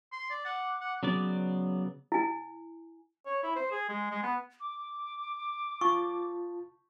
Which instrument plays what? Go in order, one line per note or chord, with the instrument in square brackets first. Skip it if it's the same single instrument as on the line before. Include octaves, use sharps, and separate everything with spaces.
[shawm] C6
D5
[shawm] F#5 [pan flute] D6
[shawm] F#5
[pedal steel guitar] C#3 F#3 B3 D5
[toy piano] E4 G#5
[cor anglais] C#5
E4
C5
G#4
G#3
G#3
B3
[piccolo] D6
[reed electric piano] F4 A5 [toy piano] C#6